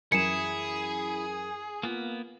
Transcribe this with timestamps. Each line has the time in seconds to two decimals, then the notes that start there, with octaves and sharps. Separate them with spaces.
0.12 F#2 E3 E4 G#4 A#4 C#7 E7
1.83 A#3 B3 F4